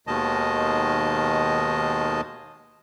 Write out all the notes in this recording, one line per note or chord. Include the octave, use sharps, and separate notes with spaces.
D#2 B2 D#3 G#3 D#5 A5